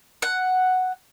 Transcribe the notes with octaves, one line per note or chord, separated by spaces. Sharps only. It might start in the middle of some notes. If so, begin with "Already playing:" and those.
F#5